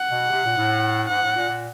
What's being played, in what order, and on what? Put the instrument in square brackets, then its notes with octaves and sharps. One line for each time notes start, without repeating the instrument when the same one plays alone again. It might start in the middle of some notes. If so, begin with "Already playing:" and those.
Already playing: [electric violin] F#5
[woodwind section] B2
C3
A#2
A2
[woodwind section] G#2 [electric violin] F#5
[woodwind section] A2
A#2
A#2